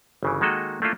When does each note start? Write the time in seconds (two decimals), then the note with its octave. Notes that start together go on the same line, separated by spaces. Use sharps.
0.23 G1 C#3 E3
0.41 D#3 G#3 A#3 F#4 A4 D#5
0.82 A3 A#3 D4 E4 F4 A4